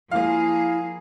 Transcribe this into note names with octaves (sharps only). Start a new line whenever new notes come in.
F3 A#3 E4 G#4 F5